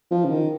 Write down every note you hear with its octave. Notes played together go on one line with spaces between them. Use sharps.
F3
C#3
D#3